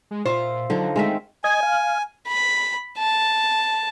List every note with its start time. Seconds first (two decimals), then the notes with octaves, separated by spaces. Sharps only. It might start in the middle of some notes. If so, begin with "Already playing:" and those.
0.11 G#3
0.25 A#2 F4 C5 E5 F5
0.70 D3 F3 F#3 D#4
0.96 D#3 G#3 A3 C4 A#4 E5
1.44 D#5 G#5 G#6
1.63 F5
2.27 B5
2.98 A5